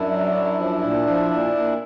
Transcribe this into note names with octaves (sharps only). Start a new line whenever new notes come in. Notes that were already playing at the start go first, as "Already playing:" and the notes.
Already playing: F#2 D4 E4
F#3
F#2
F3
A#2
F3
A#2
A#2